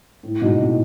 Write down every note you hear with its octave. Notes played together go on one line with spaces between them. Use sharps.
A2
G#2 B2
A2 C3